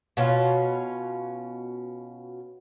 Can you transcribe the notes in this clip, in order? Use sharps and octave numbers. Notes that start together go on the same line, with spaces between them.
B2 C#4 F4